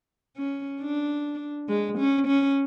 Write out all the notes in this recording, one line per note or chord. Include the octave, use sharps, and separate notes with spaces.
C#4
D4
G#3
C#4
C#4